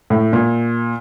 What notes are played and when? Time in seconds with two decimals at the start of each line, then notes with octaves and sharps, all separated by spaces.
0.10 A2
0.33 A#2